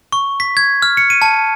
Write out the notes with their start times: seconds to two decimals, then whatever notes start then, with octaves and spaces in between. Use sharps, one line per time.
0.12 C#6
0.40 B6
0.57 G#6
0.82 F6
0.97 C#7
1.10 D#7
1.22 A5